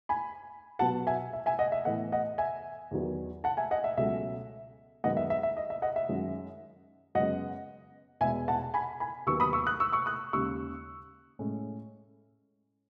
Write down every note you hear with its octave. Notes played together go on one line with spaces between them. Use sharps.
G#5 B5
B2 F#3 B3 F#5 A5
E5 G#5
E5
E5 G#5
D#5 F#5
E5
A2 E3 B3 D#5 F#5
D#5 F#5
E5 G#5
E2 D#3 F#3 B3
F#5 A5
E5 G#5
D#5 F#5
E5
C#2 B2 F#3 A3 C#4 E5
F#2 D#3 G#3 B3 D#5 F#5
E5
E5
E5
D#5
E5
D#5 F#5
E5
F#2 D#3 G#3 C#4
F#2 C#3 G#3 B3 D#5 F#5
E2 B2 G#3 B3 E5 G#5
F#5 A5
G#5 B5
G#5 B5
D#2 D#3 F#3 B3 C#6 E6
B5 D#6
C#6 E6
D#6 F#6
C#6 E6
C#6 E6
D#6 F#6
D#2 C#3 G#3 C#6 E6
A2 G#3 C#4